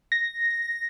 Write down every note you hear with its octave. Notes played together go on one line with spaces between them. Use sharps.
A#6